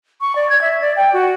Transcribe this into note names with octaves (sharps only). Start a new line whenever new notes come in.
C#6
D5
G#6
E5
D5
G5
F#4